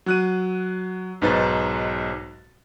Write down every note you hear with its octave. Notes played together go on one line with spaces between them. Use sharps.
F#3 F#6 D#7
B1 G#2 D#4 B4 C5 A6